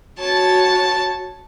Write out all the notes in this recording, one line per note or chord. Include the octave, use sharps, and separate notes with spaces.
F#4 C#5 A5